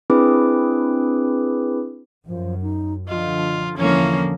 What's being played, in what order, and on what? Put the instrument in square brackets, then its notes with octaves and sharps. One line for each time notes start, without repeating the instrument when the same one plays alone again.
[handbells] C4 D4 E4 G#4 B4 D6
[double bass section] F#2 [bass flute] F3
[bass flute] D#4
[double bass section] D3 F3 [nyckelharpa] F4 [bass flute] D#5
[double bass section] E2 D3 [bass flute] E3 [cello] F3 A#3 [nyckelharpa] C#4